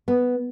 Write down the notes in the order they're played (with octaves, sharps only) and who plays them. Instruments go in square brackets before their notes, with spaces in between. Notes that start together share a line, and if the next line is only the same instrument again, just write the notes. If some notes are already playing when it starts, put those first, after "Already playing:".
[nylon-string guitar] B3